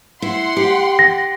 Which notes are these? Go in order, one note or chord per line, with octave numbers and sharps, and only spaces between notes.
E4 F#5 C6
G4
A#6